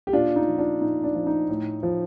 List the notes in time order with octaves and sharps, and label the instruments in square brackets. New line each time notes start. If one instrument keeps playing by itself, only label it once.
[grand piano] G4
A#2 D4 F4
D#4
F3
D4 F4
A#2 D#4
D4
F3
D#4
A2
F3